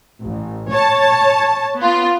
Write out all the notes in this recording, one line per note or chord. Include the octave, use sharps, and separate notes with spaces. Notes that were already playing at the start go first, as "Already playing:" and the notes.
A1
C#5 A5
B3 F4